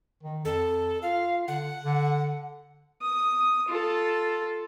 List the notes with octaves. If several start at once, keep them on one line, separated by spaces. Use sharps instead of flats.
D#3
F2 A4
F4 F5
D3 F#5
D3
D#6
F4 A4